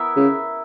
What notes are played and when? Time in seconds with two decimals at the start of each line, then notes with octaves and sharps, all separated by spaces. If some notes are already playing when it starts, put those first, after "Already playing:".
Already playing: B3 E4 A#4 E5
0.17 C#3